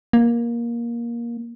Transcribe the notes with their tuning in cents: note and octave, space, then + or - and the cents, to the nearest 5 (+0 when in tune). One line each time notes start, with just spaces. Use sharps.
A#3 +15